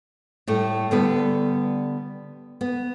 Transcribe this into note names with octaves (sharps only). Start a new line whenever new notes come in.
A2 G3 A3
D3 G3 B3 A4 B4
B3